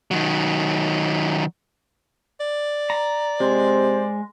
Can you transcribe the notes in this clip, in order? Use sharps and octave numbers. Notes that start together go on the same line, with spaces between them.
D#3 F#3
D5
A#5
C3 G#3 C5